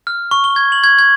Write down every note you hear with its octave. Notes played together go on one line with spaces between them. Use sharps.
F6
C#6
G7
G#6
F#7
G#6
G#6